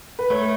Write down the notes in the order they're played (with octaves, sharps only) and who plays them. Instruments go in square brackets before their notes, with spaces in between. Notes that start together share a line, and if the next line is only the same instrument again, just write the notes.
[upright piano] B4
[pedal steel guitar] A3 [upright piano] C#5